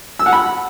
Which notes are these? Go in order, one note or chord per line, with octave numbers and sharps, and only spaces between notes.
E6
F#5
B5